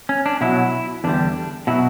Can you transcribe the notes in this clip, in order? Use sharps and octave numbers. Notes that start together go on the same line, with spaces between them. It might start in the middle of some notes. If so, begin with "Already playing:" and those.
C#4
D4
B2 F#3 E4
E2 D3 G3 D4
B2 F#3 E4